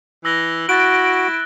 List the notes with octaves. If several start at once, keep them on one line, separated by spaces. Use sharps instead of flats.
E3 E6 A#6 G7
E4 F#4 F#6 A6 D7